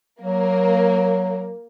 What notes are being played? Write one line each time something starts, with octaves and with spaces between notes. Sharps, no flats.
F#3 A#3